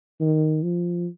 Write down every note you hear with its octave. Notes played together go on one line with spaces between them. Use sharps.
D#3
F3